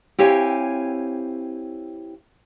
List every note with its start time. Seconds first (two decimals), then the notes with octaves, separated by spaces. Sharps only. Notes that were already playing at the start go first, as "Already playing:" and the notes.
0.19 C4 E4 G4 C#5 F5 G#5